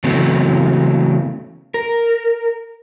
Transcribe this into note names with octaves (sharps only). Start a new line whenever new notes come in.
C#3 E3 F#3 A3 B3 C4
A#4